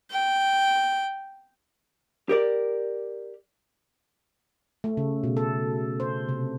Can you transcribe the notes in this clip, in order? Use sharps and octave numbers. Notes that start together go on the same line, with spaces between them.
G5
G4 A#4 D5
A3
C#3
B2
A4
C5
C3